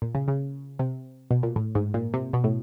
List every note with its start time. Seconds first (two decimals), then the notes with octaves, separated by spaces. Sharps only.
0.02 A#2
0.15 C#3
0.28 C#3
0.79 C3
1.31 B2
1.43 A#2
1.56 A2
1.75 G#2
1.94 A#2
2.14 C3
2.33 B2
2.44 A2